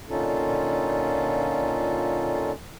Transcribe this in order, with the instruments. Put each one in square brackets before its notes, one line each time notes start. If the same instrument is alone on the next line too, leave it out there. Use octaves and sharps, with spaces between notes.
[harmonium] A#2 D3 C#4 D#4 F4 A4